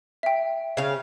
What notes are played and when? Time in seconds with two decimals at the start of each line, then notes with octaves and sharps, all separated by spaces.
0.23 E5 G5
0.77 C#3 F5